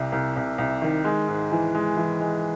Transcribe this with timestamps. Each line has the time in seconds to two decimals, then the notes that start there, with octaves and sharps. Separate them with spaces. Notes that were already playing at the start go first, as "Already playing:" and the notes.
Already playing: C2 C3
0.12 C2
0.36 C2
0.58 C2
0.82 D#3
1.04 G#3
1.28 G#2
1.52 E3
1.75 G#3
1.97 E3
2.21 G#3